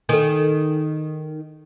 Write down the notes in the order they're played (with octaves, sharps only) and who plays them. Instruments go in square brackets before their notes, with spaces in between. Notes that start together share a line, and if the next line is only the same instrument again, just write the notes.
[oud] D#3 [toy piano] A4 G#5